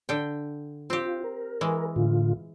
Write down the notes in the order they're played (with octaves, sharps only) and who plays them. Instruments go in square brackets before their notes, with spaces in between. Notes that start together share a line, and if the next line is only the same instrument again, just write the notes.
[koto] D3 G5
[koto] C4 G4 [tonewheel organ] F4
[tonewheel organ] A#4
[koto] E3 G#3
[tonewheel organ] A2 D3 F4